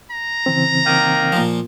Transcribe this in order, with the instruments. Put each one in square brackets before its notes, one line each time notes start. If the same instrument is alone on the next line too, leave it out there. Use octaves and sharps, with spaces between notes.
[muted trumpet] A#5
[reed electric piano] C#3 E3 C4
[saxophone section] D#3 A#3
[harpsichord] A#2 F3